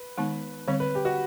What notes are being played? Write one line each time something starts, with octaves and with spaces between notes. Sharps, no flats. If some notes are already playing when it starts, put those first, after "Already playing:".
Already playing: B4
D#3 G#3 B3 D#4
D3 G3 C4 C#5
B4
G4
F#4